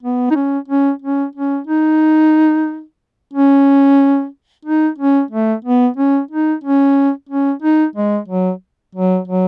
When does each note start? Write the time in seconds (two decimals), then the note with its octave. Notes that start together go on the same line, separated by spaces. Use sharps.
0.03 B3
0.31 D#4
0.35 C#4
0.68 C#4
1.02 C#4
1.35 C#4
1.67 D#4
3.33 C#4
4.65 D#4
4.98 C#4
5.31 A3
5.65 B3
5.97 C#4
6.31 D#4
6.64 C#4
7.29 C#4
7.62 D#4
7.96 G#3
8.28 F#3
8.95 F#3
9.27 F#3